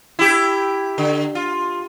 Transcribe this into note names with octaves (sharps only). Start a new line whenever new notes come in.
E4 G4
D3
F4